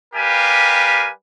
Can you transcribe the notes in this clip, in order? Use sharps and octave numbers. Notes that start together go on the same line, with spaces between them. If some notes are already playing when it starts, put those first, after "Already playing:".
G3 G4 A#4 B4 F5 G#5